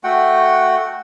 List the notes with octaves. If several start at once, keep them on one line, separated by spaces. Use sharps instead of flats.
A3 F#4 F#5 G5